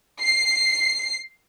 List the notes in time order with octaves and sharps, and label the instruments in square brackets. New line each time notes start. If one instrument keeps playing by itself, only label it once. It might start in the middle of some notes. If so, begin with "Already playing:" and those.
[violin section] C7